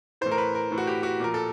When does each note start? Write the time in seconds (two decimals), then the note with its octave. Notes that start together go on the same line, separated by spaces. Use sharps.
0.21 A2 E3 C5
0.31 A#4
0.38 B4
0.55 A#4
0.71 A2 E3
0.78 F#4
0.87 G4
1.03 F#4
1.20 A#2 F3 A#4
1.34 A4